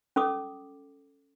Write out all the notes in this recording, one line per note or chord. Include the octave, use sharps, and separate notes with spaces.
C#4 A4 D6 D#6